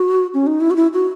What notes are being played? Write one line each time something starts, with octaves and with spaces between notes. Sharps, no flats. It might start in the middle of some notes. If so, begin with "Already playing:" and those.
Already playing: F#4
C#4
D#4
E4
F#4
E4
F#4